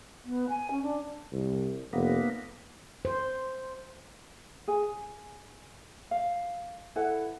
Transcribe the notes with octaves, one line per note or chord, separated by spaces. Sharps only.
B3
G#5
C#4
D4
C2
F1 A#3 B3
C5
G#4 G#5
F5
E4 A4 B4 F#5